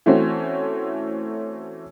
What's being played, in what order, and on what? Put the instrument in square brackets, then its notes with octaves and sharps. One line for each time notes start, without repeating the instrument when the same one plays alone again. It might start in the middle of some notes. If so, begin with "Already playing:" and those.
[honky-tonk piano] E3 A3 C4 C#4 F#4